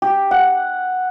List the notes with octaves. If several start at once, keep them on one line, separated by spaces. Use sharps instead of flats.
G4
F#5